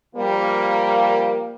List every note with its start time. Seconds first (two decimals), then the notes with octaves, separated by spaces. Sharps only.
0.15 F3 G3 A#3